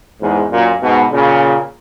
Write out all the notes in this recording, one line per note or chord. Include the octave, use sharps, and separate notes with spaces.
E2 G#2
F#2 A#2
G#2 B2
A#2 C#3